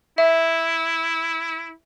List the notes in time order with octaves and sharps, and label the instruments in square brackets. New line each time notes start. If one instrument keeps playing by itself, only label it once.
[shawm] E4 [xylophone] E5